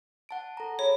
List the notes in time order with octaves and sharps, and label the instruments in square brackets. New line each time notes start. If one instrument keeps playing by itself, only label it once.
[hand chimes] F#5 A5 D7
A4 A#5
[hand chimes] G#4 B5 [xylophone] C#5